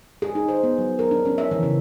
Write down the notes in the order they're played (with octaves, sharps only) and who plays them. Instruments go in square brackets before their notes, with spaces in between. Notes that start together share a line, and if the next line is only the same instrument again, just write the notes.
[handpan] G#4
D#4
C5
B3
F#3
A#4
D4
C#4
E5
E3
C#3